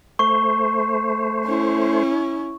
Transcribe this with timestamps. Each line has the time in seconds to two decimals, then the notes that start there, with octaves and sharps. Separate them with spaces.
0.19 A3 C5 C#6
1.46 C#4 E4